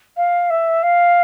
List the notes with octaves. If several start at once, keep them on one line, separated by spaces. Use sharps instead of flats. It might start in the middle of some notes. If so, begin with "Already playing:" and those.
F5
E5
F5